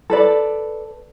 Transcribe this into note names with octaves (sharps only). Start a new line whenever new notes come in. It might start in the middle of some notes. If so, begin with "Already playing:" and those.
A4 B4 D5